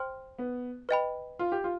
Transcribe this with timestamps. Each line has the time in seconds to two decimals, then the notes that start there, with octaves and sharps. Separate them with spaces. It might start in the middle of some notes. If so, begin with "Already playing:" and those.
Already playing: C5 G5 C6 F6
0.38 B3
0.89 B4 D#5 G5 B5
1.39 F4
1.52 G4
1.64 F4